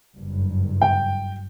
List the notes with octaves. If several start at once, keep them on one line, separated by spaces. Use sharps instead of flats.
F#1 G2
G5